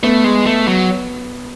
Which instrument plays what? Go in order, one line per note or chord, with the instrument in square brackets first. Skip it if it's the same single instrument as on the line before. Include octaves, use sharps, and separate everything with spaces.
[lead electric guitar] A3 [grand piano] B3
[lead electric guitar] G#3
A3
F#3